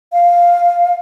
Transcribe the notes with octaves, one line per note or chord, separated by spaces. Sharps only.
F5